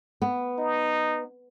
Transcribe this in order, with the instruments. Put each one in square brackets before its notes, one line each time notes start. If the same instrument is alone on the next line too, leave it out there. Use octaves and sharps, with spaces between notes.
[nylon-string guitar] B3
[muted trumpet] D#4